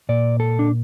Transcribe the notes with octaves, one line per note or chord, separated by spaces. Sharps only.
A#2 D5
A4
D4